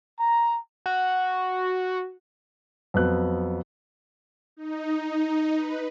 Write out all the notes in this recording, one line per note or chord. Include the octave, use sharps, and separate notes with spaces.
A#5
F#4
F2 F#3 B3 F#6
D#4
B4